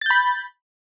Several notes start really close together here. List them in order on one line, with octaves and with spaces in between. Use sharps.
A6 G6 B5